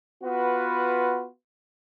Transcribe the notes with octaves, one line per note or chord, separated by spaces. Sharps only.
B3 F4 F#4 B4